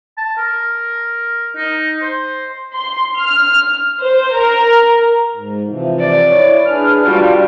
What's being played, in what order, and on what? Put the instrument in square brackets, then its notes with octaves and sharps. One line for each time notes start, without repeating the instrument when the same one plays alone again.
[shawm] A5
A#4
D#4
C5
[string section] C6
F6
C5
A#4
[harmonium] G#2
C3 E3 F3
[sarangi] D5
[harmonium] E4 [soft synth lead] C#5
[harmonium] D4 G#4 B4 [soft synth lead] F6
[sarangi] G3 [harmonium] D4 F4 F#4